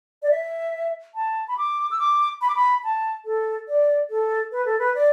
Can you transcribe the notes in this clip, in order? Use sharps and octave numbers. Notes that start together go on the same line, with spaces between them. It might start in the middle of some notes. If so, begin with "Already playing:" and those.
D5
E5
A5
B5
D6
E6
D6
B5
D6
B5
A5
A4
D5
A4
B4
A4
B4
D5